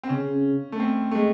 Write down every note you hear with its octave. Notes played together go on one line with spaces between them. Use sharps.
C4
C#3 C#4
A3
C4
A3
G#3